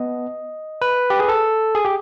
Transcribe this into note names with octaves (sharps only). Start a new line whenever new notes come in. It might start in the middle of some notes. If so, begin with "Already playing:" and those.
Already playing: B3 D#5
B4
G4
G#4
A4
G#4
G4